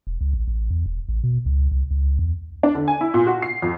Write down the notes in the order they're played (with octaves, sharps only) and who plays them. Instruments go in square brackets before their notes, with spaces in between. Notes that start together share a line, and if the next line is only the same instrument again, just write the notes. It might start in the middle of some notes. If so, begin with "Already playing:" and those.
[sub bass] E1
C#2
A1
A1
E2
E1
A1
B2
C#2
C2
C#2
E2
[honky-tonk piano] D4
D3
G#5
E4
A#2
F#4
C7
F2